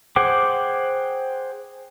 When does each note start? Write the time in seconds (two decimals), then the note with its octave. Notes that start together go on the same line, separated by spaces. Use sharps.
0.16 G#4 C5 F#5 G5 D6